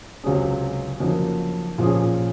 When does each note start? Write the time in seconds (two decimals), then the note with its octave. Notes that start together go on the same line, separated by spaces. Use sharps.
0.24 C#2 C3 F#3 C#4 G#4
1.00 F2 C#3 F#3 A#3 D#4
1.78 A#2 F3 A#3 C#4 G#4